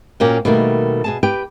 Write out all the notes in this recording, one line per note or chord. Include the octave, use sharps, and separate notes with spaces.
A#2 A#3 C#4 F#4 F#5 G5
B2 D#3 G3 A3 A#3
B2 G#4 A5
G4 B4 G5